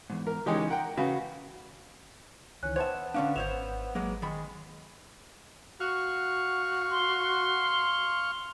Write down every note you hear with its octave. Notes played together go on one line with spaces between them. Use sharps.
E2 G#2
A#4
C#2 E3 G#3 C#4 D#4 G4
A#4 F#5 G5
C#3 F#4 B4
C#2 D#3 E3 C#4 F#6
B3 C5 C#5 E5 G5 A5
D3 C#4 D4 F5
G#1 C5 C#5 E5 F7
F#3 G#3 A#3 B3
D#3 G#3 B5
F#4 F5 C#6
C6